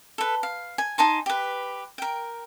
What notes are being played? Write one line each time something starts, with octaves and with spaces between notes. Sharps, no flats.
A4 B4
F5
G#5
D#4 G#5 A5 C6
G4 B4
A#4 G5